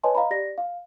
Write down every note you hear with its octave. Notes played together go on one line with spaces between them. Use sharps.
B4 C#5 D#5 G#5 A5 C6
D#5 F5 A#5 B5
G4 D5 A#6
F5